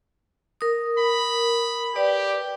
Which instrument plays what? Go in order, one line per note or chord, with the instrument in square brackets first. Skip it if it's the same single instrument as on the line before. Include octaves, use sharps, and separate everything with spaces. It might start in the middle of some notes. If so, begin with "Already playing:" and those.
[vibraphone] A#4 D#6
[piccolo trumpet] B5
[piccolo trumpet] G4 [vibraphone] B4 D5 G5